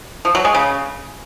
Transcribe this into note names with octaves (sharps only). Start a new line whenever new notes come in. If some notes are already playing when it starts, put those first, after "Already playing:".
F3
F#3
G#3
C#3